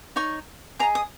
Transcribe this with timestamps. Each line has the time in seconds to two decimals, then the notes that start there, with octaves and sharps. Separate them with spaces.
0.16 D#4 C#5 C#6
0.79 G#4 A#5
0.83 D#5
0.95 D#6